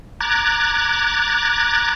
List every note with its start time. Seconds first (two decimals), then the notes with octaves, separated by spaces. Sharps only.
0.21 A#5 D6 F#6 G#6 A6